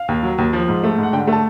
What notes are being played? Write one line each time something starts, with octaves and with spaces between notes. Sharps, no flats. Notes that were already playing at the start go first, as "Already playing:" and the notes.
Already playing: F5
D#2
F#3
D#2
F3
G#2
A3
G#2 F#5
D3 G5
A3
A5